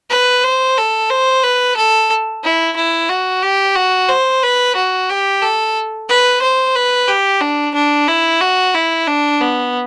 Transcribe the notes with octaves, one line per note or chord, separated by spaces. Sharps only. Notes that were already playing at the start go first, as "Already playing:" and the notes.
B4
C5
A4
C5
B4
A4
E4
E4
F#4
G4
F#4
C5
B4
F#4
G4
A4
B4
C5
B4
G4
D4
D4
E4
F#4
E4
D4
B3